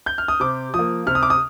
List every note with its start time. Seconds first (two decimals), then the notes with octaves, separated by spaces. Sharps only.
0.06 G6
0.18 F6
0.28 D#6
0.40 C3 D6
0.74 F3 A#3 D#6
1.06 C3 F6
1.15 D#6
1.23 D6
1.30 D#6